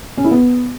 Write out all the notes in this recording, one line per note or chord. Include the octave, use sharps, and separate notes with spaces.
C#4
E4
B3